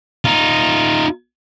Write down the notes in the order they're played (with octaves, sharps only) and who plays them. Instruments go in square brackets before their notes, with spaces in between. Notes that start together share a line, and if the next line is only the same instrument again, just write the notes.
[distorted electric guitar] D#4 F4